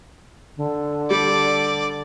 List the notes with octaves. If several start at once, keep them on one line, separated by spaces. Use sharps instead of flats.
D3
G3 D5